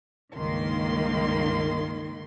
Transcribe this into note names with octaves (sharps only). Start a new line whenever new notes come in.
C#2 G2 D#3 A#3 C6